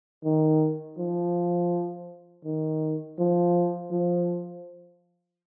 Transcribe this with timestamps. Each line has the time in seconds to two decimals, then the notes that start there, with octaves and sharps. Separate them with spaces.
0.24 D#3
0.98 F3
2.45 D#3
3.19 F3
3.91 F3